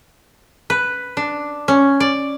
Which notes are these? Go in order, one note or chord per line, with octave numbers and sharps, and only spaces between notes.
B4
D4
C#4
D5